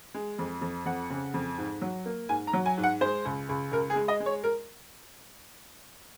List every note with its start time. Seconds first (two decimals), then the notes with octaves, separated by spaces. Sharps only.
0.14 G#3
0.39 F2
0.61 F2
0.85 F2 F#5
1.10 C#3
1.34 F2
1.58 G#2
1.81 F#3
2.05 A#3
2.29 G#2 G#5
2.47 A#5
2.53 F#3
2.66 G#5
2.77 G#2
2.83 F#5
3.01 G#3 C5
3.25 C#2
3.49 C#2
3.72 C#2 A#4
3.90 G#4
3.96 G#3
4.08 D#5
4.20 G#3
4.26 C#5
4.44 A#4